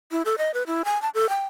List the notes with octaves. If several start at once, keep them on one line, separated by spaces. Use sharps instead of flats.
E4
A4
D#5
B4
E4
G#5
A5
A4
G5